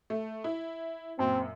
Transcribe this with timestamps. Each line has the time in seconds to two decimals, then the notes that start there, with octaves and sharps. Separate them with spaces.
0.10 A3
0.44 E4
1.19 F#2 A#2 C4